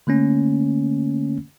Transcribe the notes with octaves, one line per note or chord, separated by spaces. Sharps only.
D3 A3 A#3 C#4